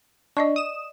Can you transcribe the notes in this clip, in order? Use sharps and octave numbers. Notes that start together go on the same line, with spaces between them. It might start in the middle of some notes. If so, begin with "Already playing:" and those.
D4 D5 D#5 C#6
D#6 E7